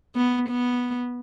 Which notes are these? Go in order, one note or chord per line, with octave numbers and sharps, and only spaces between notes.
B3
B3